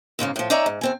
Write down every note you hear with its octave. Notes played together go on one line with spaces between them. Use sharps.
E2 G#2 C#3 A#3
A2 F3
D#4 C#5 D5 E5 G#5 A#5
G#2
E2 C4 G#5